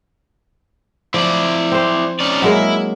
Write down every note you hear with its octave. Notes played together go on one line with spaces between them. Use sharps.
F3 E4 D5
C4 C5
C#4 D#4 D5
F#3 G#3 A#3 E4